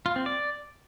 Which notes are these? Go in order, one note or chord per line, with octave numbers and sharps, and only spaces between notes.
F4
C4
D5